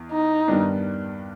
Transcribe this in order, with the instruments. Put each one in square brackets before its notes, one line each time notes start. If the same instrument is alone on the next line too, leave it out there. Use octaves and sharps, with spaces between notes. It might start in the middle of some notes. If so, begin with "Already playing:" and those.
Already playing: [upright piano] E2
[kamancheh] D#4
[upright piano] G2 D#3 G3 B3 D4